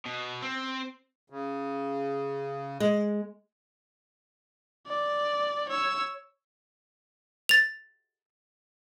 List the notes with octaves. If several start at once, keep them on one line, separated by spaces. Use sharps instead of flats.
B2
C4
C#3
G#3
D5
C#5 E6
A6 F7